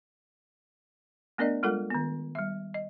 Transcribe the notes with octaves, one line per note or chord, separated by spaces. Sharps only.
A3 B3 D4 A#4 D5 D#5
G3 G#3 F4 A4 A#4 F#5
D#3 B3
G3 E5
D#5